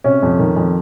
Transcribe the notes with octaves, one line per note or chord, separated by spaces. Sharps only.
C3 C#4
F2
D#3
F2